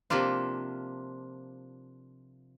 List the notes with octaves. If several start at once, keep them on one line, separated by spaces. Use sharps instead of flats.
C3 F3 A#3 D4 F4